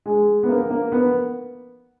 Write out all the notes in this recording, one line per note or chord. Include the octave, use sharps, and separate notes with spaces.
G#3
B3
A#3
A#3
B3